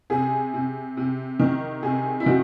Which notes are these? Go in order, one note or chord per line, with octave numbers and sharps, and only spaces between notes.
C3 G#4
C3
C3
D#3
C3 G#4
E4
D#3 F#4